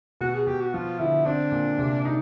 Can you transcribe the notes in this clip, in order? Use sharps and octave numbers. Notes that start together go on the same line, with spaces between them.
B2 F#4
G#4
B2 G4
F#4
F3 F4
D3 E4
C4 D4
A#2
C3
D#4